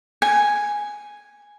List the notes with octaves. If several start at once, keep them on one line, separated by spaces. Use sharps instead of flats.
G#5